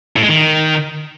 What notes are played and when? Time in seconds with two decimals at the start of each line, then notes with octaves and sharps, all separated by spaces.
0.16 A2
0.23 G#3
0.29 D#3